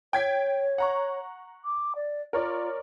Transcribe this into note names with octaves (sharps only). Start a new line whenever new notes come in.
C#5 G5 G#6 B6
F#5 A#5 C#6
D6
D5
F4 A#4 C#5 D5